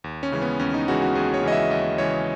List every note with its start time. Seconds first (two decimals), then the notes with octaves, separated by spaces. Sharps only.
0.04 D#2
0.23 C#4
0.32 C#3 E3 G#3
0.42 B3
0.59 D#2 C#4
0.74 D#4
0.88 C#3 E3 G#3 F#4
1.02 F#4
1.15 D#2 G#4
1.34 C#5
1.43 C#3 E3 G#3 D#5
1.52 E5
1.71 D#2 D#5
1.98 C#3 E3 G#3 C#5